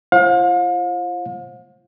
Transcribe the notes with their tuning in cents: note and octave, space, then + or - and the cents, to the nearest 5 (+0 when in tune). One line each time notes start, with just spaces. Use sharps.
F4 -45 C5 +30 F5 +40